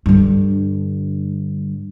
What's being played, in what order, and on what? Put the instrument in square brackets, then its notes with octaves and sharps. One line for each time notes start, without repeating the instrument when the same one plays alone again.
[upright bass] G2 D3